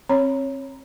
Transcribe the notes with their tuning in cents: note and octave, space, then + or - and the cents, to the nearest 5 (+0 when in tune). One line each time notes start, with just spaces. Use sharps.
C4 +35 C#5 +0 B5 +15